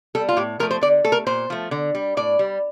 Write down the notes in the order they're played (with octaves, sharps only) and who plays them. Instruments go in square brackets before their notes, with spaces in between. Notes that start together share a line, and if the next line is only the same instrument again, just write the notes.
[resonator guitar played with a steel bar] G3 A4
F4
A2 G4
F3 A3 A#4
C5
D3 D5
A3 A4
A#4
A#2 C5
F3 A3
D3
G3
A2 D5
G3